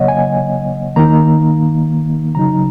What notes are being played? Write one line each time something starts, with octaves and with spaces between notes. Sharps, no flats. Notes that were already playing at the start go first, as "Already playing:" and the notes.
Already playing: C#3 F#3 A#3 C#5 D#5 F#5
G#5
D#3 A#3 D#4 A#5
C#3 F#3 D#4 A#5